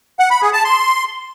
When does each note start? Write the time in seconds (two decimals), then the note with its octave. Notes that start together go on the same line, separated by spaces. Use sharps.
0.19 F#5
0.31 B5
0.42 G#4
0.53 A5
0.64 C6